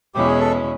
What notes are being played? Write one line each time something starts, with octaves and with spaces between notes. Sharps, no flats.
E2 B2 G#3 C#4 E4 G4
G#4
A4